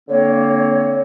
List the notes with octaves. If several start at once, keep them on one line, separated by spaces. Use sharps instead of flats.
D3 A#3 C4 C#5